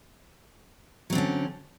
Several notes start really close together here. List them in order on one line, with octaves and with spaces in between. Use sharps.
F#3 C4 D3 C#4